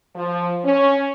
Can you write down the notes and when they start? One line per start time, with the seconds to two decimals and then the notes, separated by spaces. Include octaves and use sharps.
0.16 F3
0.65 C#4